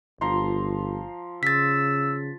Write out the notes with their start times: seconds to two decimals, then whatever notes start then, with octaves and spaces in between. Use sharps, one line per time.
0.21 G1 F3 A#5 C6
1.43 C#3 E6 A6 B6